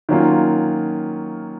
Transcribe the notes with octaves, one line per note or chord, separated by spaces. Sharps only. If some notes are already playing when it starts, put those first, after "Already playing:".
D#3 F#3 A#3 C#4 F4